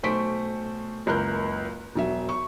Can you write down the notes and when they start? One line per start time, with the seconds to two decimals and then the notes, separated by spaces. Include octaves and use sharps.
0.03 B1 A3 C5 C#6 B6 D7
1.06 F#1 C#2 A#4 F#6 G6
1.95 E1 F#3 E5
2.29 C#6